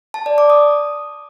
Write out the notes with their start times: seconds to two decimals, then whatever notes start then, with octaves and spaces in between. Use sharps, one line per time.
0.14 A5
0.26 D5
0.38 D6
0.50 D#6